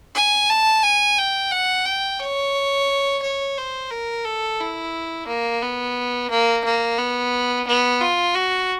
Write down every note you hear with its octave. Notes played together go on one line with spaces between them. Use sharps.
G#5
A5
G#5
G5
F#5
G5
C#5
C#5
C5
A#4
A4
E4
A#3
B3
A#3
A#3
B3
B3
F4
F#4